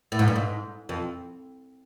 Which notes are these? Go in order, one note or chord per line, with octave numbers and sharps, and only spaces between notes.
A2
G#2
G2
G#2
F2